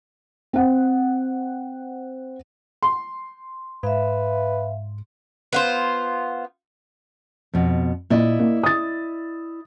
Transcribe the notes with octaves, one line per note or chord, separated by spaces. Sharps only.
C4 F#5
C6
G#2 B4 E5 F5
B3 F4 C5
F2 B2
A#2 E4 D5 D#5
A#3
D#6 A6